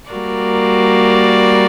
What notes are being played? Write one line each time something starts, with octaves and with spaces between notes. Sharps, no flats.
G3 A#3 F#4 A#4 D5